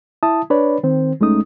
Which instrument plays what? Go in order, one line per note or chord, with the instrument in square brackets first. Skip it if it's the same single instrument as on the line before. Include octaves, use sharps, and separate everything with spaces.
[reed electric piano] E4 E5 A5 D#6
D4 B4 C#5 D5 B5
D#3 C4 C5
C2 G#3 A3 C#4 D#4 D#6